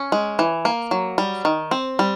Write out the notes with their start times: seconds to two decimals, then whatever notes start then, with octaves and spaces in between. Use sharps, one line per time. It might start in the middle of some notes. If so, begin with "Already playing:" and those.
Already playing: C#4
0.12 G#3
0.39 E3
0.65 A#3
0.91 F#3
1.18 G3
1.45 D#3
1.71 C4
1.99 G3